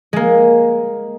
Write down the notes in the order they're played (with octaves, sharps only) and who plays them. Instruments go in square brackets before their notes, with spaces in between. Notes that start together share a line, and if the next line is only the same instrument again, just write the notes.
[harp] G#3 A#3